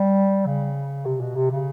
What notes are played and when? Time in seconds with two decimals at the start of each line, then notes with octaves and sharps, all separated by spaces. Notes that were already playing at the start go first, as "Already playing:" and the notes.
Already playing: G3
0.46 C#3
1.06 C3
1.21 B2
1.36 C3
1.51 C#3